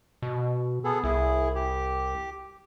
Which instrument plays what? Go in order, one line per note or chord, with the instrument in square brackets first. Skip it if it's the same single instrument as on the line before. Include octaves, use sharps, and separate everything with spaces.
[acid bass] B2
[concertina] B3 G#4 A4
[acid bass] C2 [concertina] E4 G#4
[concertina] G4